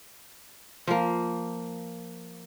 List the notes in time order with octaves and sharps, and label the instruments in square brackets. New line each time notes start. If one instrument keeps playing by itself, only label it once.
[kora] F3 A#3